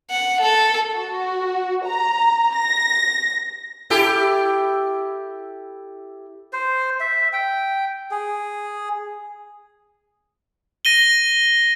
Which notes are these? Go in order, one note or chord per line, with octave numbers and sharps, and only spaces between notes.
F#5
A4
F#4
A#5
A#6
E4 G4 A4
C5
E5
G5
G#4
A#6 D#7 G7